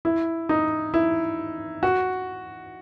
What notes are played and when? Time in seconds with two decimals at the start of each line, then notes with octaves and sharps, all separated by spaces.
0.05 E4
0.49 D#4
0.94 E4
1.83 F#4